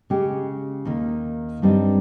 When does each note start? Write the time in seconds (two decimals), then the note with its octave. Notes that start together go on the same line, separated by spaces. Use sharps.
0.10 C#3 G#3 C#4 G4
0.85 D#2 D#3 A#3
1.62 G2 G3 C4 D#4